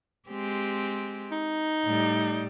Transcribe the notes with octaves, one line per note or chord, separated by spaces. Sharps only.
G#3 C4 G4
D#4
A2 G3 D5